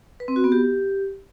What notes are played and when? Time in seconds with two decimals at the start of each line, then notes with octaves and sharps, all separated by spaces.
0.20 B4
0.28 C4
0.36 F#4
0.44 B3
0.52 G4